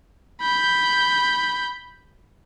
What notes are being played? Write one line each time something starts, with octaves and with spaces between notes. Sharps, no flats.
B5 G6